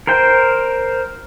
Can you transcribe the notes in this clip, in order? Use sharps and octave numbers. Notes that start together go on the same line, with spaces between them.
A#4 C5 G5